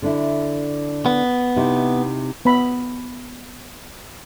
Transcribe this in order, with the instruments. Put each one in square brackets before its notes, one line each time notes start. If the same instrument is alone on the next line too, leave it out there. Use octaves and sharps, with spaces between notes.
[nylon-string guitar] D3 D4 E4
[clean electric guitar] B3
[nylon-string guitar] C3 D#4 E4
[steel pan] B3 B5